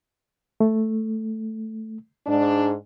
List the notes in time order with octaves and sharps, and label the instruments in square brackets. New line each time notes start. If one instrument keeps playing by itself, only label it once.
[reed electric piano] A3
[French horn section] G#2 D4